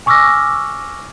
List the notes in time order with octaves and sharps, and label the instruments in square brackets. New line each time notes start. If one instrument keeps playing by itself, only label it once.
[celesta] G#5 C#6 D6 E6 F6 A#6